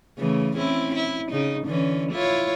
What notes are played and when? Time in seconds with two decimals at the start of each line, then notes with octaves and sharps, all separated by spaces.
0.18 C#3 E3 A3
0.56 C4 C#4 E4
0.95 E4
1.31 C#3 D#4
1.66 D3 E3 C#4
2.12 E4 F4 C#5